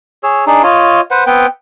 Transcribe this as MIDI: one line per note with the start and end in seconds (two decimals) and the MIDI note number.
0.23 0.45 68
0.23 0.45 73
0.23 0.45 88
0.47 0.62 62
0.47 0.62 63
0.47 0.62 68
0.63 1.01 65
0.63 1.01 73
0.63 1.01 75
1.11 1.24 71
1.11 1.24 72
1.11 1.24 78
1.27 1.46 59
1.27 1.46 60
1.27 1.46 71
1.27 1.46 79